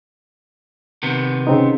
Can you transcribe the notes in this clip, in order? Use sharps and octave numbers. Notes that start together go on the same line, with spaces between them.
C3 D#3 B3
C#3 C4 D#4